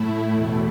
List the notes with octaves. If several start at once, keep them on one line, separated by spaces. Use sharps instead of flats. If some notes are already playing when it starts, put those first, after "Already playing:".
Already playing: A2 A3 E4
E2 B2 A3